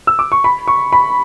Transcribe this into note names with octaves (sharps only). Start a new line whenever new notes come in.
E6
D6
C#6
B5
C#6
B5